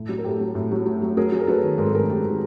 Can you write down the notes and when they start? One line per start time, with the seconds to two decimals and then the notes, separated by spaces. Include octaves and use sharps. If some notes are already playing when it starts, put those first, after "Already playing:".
Already playing: A2
0.09 F#3
0.18 A#4
0.24 A2 G4 A4
0.40 F#3
0.55 A2
0.71 F#3
0.86 F#3
1.02 F#3
1.17 F#3 G#4 A#4
1.32 F#3
1.40 A#4
1.47 F#3 A4 B4
1.63 D#3
1.78 G#2 A#4
1.86 A4
1.94 G#2 G#4 A#4
2.09 G#2 G4 A4
2.25 D#3